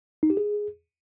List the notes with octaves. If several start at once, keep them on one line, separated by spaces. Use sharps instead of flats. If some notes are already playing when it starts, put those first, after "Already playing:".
D#4
G4
G#4